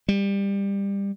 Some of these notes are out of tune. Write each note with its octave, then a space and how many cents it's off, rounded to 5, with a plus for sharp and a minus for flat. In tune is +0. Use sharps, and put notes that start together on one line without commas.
G3 +20